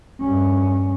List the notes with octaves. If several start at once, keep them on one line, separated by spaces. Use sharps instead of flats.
G2 C#4